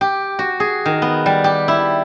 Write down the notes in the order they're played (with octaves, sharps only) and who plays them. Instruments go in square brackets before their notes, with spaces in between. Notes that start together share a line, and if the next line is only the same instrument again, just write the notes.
[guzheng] G4
F#4
G#4
D#3
B3
G3
G4
E4